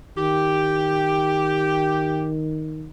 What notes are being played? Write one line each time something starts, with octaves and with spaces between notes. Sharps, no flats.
D#3 G4